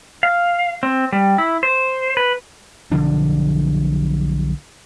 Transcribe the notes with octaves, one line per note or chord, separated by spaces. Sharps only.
F5
C4
G3
E4
C5
B4
B1 D3 F3 D4